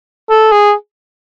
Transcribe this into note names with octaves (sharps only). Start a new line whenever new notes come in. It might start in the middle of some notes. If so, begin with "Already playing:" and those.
A4
G#4